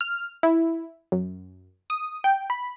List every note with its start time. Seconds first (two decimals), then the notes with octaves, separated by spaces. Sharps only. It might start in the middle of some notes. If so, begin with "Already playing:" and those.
0.01 F6
0.43 E4
1.12 F#2
1.90 D#6
2.24 G5
2.50 B5